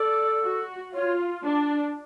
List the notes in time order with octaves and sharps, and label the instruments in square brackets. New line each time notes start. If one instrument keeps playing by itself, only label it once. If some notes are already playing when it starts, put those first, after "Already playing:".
Already playing: [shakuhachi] A4 [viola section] D5
[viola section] F#4
[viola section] F4 [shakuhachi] C#5
[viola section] D4